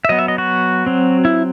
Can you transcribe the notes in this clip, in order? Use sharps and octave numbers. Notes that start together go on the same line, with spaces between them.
E5
F#3 B3 D#5
E5
D#5
F#4
F#3 C4
E4